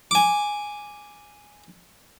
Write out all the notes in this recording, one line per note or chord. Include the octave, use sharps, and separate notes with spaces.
G#5 D6